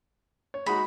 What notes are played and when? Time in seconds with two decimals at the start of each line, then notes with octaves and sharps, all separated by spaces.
0.54 C#5
0.66 G#3 D#4 F#4 B5